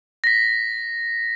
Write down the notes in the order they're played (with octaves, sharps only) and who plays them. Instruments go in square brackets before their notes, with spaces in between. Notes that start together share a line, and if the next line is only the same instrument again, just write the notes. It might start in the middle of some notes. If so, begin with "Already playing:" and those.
[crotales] A#6 B6